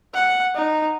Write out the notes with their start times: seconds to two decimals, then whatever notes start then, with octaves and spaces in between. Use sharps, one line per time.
0.14 F#5
0.55 D#4